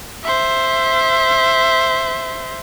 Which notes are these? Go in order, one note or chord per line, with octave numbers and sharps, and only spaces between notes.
C5 E5